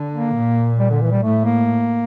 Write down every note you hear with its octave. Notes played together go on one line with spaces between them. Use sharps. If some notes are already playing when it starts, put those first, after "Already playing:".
Already playing: D3
A#3
A#2
G3
D3
E3
G3
A2 A3
A#3